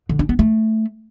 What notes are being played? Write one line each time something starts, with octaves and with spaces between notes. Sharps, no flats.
D3
D4
B3
A3